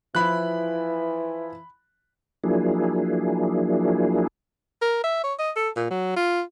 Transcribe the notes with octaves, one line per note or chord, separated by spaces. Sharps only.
E3 F3 E4 B5 F#6
F3 F#3 A#3 D4 E4 G#4
A#4
E5
C#5
D#5
A4
A#2
F#3
F4